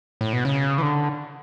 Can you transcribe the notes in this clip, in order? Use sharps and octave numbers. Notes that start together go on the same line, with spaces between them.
A2
B2
C#3
E3
D3